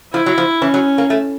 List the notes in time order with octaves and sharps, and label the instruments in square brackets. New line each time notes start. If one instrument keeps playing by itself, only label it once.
[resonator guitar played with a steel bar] F3 [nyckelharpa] E4
[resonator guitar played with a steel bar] F#3
F3
[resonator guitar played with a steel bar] E3 [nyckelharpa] C#4
[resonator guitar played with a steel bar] F#3
A#3
A3